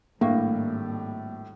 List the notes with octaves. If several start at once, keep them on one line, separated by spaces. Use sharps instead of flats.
G#1 A2 G3 A3 A#3 D4 F5 C#6